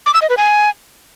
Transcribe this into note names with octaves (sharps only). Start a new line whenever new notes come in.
D6
E6
D#5
B4
G#5